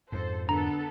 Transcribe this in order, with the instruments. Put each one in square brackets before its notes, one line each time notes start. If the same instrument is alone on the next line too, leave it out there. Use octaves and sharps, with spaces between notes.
[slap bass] F2 G#2 [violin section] A4 C5
[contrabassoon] D3 [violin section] B3 A4 A#4 [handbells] A#5